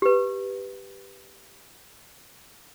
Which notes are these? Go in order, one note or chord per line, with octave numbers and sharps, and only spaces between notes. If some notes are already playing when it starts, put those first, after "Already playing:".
G4 B4